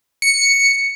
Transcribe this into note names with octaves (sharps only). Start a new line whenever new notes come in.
C#7